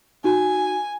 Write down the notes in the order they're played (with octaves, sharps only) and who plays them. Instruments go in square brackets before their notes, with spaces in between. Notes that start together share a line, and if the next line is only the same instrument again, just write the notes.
[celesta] D#4 F#4 [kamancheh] G#5